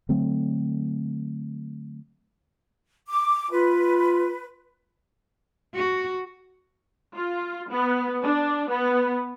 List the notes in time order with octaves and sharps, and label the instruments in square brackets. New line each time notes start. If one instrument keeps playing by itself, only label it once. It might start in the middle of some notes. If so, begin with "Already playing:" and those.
[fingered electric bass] D3 F#3 A3 C4
[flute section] D6
[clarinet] F4 [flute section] B4
[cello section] F#4
[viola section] F4
B3
D4
B3